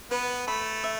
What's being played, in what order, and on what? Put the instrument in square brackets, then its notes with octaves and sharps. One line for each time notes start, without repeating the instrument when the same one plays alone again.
[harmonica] B3 [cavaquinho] B4
[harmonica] A3 [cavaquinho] B5
[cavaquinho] E5